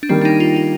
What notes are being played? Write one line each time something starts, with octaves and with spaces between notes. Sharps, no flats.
D4
D#3 G3 A#3 C4
D4
D#4
F4
F4